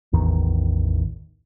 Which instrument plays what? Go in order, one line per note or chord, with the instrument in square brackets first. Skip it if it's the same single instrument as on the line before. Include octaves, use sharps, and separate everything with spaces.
[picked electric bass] A1 E2 D#3